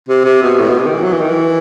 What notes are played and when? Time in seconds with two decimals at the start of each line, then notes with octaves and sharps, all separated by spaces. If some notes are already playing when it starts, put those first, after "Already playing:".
0.09 C3
0.25 C3
0.43 B2
0.60 A2
0.69 B2
0.78 C3
0.86 D#3
0.94 E3
1.03 F#3
1.13 E3
1.21 D#3
1.29 E3